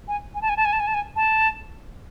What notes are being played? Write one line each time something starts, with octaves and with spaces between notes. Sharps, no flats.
G#5
G#5
A5
G#5
A5
G#5
A5
G#5
A5
G#5
A5